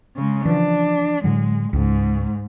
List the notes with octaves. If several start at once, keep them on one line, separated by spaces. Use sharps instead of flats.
C#3 G#3
E3 F3 D4
A2 D3 F#3 G#3
C#2 G#2